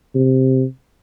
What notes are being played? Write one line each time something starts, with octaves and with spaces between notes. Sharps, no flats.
C3